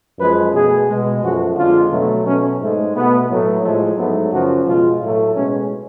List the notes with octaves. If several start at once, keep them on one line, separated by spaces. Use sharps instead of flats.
F#2 F3 G#3 B4
B2 A3 G#4
B2 G#3
F#2 F3 A3 F#4
F2 D3 G#3 F4
B2 F#3 A3
B2 F#3 A3 C#4
G#2 G#3 A3
B2 A3 B3
A2 F#3 A3
A2 F3 G#3 A3
G#2 F#3 A3 B3
F#2 C#3 F3 F#4
B2 G#3 F4
A2 F#3 A3
B2 G#3 C#4